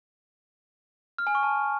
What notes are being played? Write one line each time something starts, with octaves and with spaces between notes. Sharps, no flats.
F6
G#5
C#6
A5